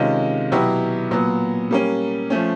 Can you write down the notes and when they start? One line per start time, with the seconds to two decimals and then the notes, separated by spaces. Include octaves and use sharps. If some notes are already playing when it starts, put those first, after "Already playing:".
Already playing: C3 D#3 G#3 C#4 F4
0.52 B2 F#3 B3 E4 G4
1.11 A#2 F#3 B3
1.71 G3 A#3 C#4
2.30 F3 A3 C#4